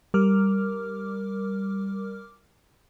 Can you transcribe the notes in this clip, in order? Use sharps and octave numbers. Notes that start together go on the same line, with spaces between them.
G3 A#4 D6 F6